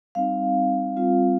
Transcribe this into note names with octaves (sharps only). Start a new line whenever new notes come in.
G3 C4 D#4 F5
G3 C4 F4